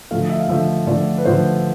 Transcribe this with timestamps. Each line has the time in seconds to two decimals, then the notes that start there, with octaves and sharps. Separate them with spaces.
0.11 D3 F3 A3 F5
0.29 E5
0.40 F5
0.49 D3 F3 A3 E5
0.87 D3 F3 A3 D5
1.18 B4
1.25 D3 F3 A3 C5